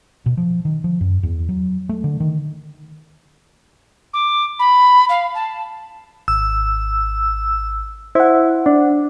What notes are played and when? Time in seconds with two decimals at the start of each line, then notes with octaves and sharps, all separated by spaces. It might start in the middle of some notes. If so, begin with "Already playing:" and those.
0.26 B2
0.37 F3
0.65 D#3
0.84 F3
1.01 F#2
1.23 E2
1.49 F#3
1.89 A3
2.04 D3
2.20 D#3
4.14 D6
4.59 B5
5.09 F5
5.35 A5
6.28 G#1 E6
8.15 E4 C5 F#5
8.66 D4